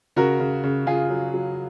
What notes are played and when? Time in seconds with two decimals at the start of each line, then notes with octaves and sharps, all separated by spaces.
0.16 C#3 F#4 A#4
0.40 C#3
0.64 C#3
0.86 C#3 F4 G#4
1.10 F#3
1.34 F#3